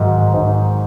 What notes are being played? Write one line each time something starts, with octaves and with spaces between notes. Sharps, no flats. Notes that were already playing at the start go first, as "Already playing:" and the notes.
Already playing: G#2 D#3 F#3
G#2